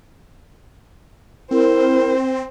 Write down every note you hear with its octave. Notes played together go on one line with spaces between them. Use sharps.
C4 E4 A#4 C5